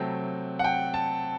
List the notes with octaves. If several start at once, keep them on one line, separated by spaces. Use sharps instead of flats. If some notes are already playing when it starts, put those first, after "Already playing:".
Already playing: C3 F#3 A3 C4 G5
F#5
G5
A5